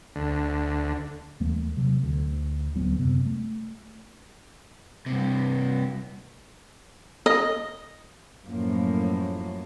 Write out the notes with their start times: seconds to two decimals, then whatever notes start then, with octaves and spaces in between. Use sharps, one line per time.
0.16 D2
1.40 D#2 E3 A3 A#3
1.77 C3 F#3
2.03 D2
2.75 D1 D2 F#3 B3
2.99 F#2 C3 B3
3.26 A3
5.06 G2 C3
7.26 D#5
8.46 F#2 A2 F3 A#3